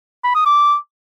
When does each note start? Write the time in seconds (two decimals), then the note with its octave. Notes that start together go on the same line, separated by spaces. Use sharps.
0.24 B5
0.35 D#6
0.46 D6